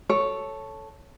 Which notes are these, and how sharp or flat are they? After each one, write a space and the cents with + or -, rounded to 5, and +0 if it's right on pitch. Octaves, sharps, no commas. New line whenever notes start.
A4 +0 C#5 +0